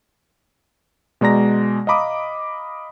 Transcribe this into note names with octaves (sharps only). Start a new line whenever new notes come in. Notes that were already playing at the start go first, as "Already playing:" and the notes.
B2 G#3 D5 A#5 A#6
D#5 F5 A#5 B5 D6 D#6